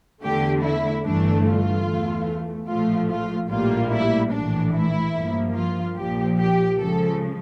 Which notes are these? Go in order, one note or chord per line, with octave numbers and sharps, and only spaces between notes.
E2 D3 A3 G4
E4
G1 G2 E3 A3 D4
F4
E2 E3 A3
A#1 A2 F3 A3 F4
F4
A#1 A2 G3 A#3 F4
E4
A#1 A2 E3 D4
E4
G2 F3 A#3
F4
A#1 A#2 F3 G4
G4
C#2 C#3 F3 A4